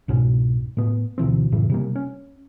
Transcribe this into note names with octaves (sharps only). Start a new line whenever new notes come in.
C2 G#2 B2 C#4
A2 B3
D2 B2 E3 C4
F#2 A2 C#3 E3
C3 G3 A#3
C#4